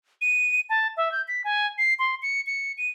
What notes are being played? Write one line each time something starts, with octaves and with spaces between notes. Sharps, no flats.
D#7
A5
E5
G6
B6
G#5
C7
C6
C#7
C#7
D#7